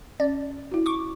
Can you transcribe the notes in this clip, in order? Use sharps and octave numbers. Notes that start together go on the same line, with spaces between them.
C#4 D5
E4 F#4
C#6 D6